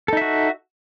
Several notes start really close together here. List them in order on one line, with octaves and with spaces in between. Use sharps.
A4 D#4 E5 F#4